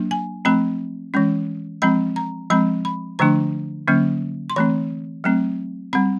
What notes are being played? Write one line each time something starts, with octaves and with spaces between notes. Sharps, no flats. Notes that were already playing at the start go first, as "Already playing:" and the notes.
Already playing: F#3 A#3 D4
G#5
F3 A3 C4 B5
E3 G#3 C#4
F3 G#3 C4 B5
A#5
F3 G#3 C4 B5
B5
D3 F3 A3 D4 A#5
D3 F#3 A#3 C#4
C6
E3 A3 C4 B5
F#3 A3 C4
G3 C4 B5